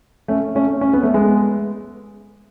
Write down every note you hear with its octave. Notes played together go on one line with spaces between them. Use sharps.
A3 C#4
A3 C#4
C#4
B3
A3
G#3 B3